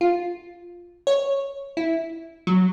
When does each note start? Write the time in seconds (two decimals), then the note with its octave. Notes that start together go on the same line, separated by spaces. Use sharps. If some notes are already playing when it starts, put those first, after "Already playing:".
0.01 F4
1.07 C#5
1.77 E4
2.47 F#3